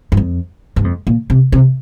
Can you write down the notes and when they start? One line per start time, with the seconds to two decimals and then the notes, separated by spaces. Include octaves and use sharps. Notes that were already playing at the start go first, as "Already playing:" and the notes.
0.12 G2
0.17 F2
0.76 G2
0.84 F2
1.07 A#2
1.30 C3
1.52 C3